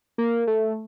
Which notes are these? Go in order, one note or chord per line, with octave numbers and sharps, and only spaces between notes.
A#3
A3